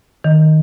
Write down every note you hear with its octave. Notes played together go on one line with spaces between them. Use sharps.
D#3